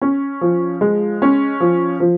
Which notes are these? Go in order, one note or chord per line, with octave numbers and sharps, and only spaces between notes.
C#4
F3
G#3
C#4
F3
F3